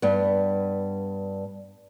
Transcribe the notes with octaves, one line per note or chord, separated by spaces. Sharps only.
G2 B3